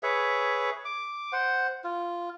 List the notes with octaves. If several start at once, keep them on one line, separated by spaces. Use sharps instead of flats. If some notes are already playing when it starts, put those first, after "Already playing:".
G#4 B4 C#5 E5
D6
C5 F#5
F4